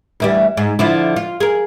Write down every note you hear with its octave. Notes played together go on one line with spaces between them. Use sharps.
D2 E3 G3
G#2
D3 F3 E4
F4
G#4 A#4